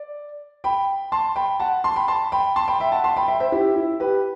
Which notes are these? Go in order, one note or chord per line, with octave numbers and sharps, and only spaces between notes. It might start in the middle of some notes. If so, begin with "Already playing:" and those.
Already playing: D5
G5 B5
A5 C6
G5 B5
F#5 A5
A5 C6
G5 B5
A5 C6
G5 B5
A5 C6
G5 B5
E5 G5
F#5 A5
A5 C6
G5 B5
E5 G5
C5 E5
E4 G4
E4
G4 B4